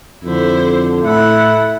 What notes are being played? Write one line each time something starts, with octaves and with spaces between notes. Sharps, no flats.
F2 D3 E4 C5
A2 E4 A4 F#5